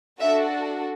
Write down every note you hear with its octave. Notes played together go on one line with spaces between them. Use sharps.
D4 F#4 A4 E5